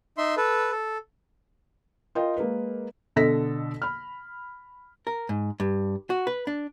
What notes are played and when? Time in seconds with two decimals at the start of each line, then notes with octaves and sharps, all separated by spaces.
0.18 D#4 E5 C6
0.37 A4 B4
0.72 A4
2.15 F4 A#4 D#5 G5
2.37 G#3 A#3 A#4 B4
3.16 B2 D3 A4 D#5 A#6 B6
3.82 B5 F6
5.07 A#4
5.29 G#2
5.60 G2
6.10 F#4
6.27 B4
6.47 D4